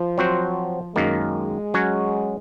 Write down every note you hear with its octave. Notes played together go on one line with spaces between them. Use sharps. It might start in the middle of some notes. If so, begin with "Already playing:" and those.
Already playing: F3
F#3 C4 F#4 C5
F#2 D#3 G#3 A#3
F#3 C#4 F#4 C#5